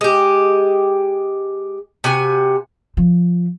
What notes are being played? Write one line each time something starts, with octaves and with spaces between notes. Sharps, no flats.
G#3 G4
C3 F#4 G#5
F3